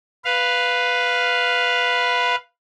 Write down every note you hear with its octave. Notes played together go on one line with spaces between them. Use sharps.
B4 F5